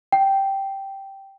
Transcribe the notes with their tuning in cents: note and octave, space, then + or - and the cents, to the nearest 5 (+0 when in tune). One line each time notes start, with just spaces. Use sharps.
G5 -5